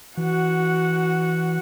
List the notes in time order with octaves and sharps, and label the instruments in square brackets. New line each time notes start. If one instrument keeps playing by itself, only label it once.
[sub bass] E3 [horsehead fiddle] F#4 F#5